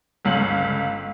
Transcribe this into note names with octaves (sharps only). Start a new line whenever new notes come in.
G1 C#2 F5 F#7